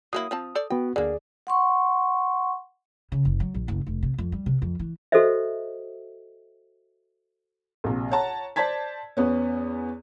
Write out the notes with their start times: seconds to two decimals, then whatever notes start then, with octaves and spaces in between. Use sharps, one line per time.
0.13 F#3 A#3 E4 D#6
0.31 F3 C4 A5
0.55 A4 C5 D5
0.70 B3 F#4 G5
0.96 D2 D3 A#3 G#4 D5
1.47 F#5 C6 C#6
3.12 C#3
3.25 F#1
3.40 F#3
3.54 A#1
3.68 F#1
3.86 F1
4.03 C3
4.18 F2
4.32 G3
4.46 C3
4.62 F2
4.79 E3
5.12 F#4 A4 B4 C5 D#5 E5
7.84 A#1 C3
8.11 C#5 F#5 A5 A#5
8.56 C5 D5 A5 G#6 B6
9.17 E2 B3 C#4